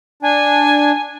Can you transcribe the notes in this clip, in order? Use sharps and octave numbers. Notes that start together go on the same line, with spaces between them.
D4 G#5